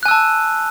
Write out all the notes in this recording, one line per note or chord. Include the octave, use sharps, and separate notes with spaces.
G#5 A5 E6 F#6